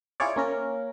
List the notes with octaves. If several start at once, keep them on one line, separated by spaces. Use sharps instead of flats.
E4 F4 G#4 C#5 D5
A#3 C#4 A#4